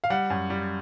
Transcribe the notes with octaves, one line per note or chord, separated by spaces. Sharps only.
F5
G3 F#5
F#2
G3